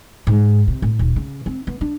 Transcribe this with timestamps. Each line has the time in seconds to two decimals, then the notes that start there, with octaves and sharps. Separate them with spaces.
0.27 G#2
0.68 C3
0.82 A2
0.99 D#1
1.16 C#3
1.46 C4
1.67 B3
1.81 D4